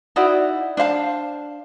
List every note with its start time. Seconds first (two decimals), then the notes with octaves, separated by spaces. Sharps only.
0.16 D#4 E4 F#4 D5
0.77 D4 C5 F5 A5